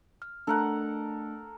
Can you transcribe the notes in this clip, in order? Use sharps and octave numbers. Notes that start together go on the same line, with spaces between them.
F6
A3 D4 A4 A#4 F#5